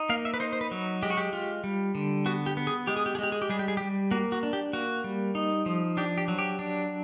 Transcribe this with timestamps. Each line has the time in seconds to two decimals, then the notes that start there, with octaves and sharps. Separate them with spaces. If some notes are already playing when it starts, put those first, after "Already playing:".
Already playing: D#4
0.09 A#3 F5
0.25 E5
0.34 B4
0.40 D#4 C5
0.53 C5
0.61 B4
0.71 F#3
1.03 G#3 G4
1.10 F#4
1.17 G4
1.33 F4
1.64 G3
1.95 D3
2.26 B3 F#4
2.46 G4
2.57 B3
2.67 G#4
2.87 G#3 G4
2.97 G#4
3.06 G4
3.15 G#4
3.19 G#3 G4
3.32 G#4
3.42 G4
3.49 G3 G#4
3.59 G4
3.68 G#4
3.77 G3 G4
4.11 A#3 F#4
4.32 F#4
4.43 D4
4.53 G4
4.73 A#3 F#4
5.04 G3
5.35 D#4
5.66 F3
5.97 D4 G4
6.18 G4
6.28 F#3
6.39 G4
6.59 D4